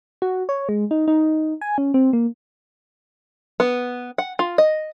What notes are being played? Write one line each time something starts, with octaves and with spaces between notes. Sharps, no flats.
F#4
C#5
G#3
D#4
D#4
G#5
C#4
C4
A#3
B3
F#5
F4
D#5